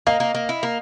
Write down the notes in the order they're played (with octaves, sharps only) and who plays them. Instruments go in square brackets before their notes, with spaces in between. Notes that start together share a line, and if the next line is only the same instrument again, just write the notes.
[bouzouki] A#3 [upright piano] D#5 F5
[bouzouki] A#3
A#3
E4
A#3